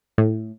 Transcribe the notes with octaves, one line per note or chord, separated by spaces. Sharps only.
A2